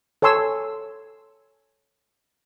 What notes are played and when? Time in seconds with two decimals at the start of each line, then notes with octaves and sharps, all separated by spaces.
0.22 A4 C#5 G#5 C6 E6